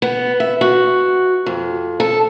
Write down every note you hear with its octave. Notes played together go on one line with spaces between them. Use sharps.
B3
E5
F#4
F2
A4